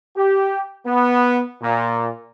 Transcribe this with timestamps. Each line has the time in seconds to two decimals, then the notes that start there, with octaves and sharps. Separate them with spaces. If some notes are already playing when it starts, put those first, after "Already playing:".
0.16 G4
0.86 B3
1.62 A#2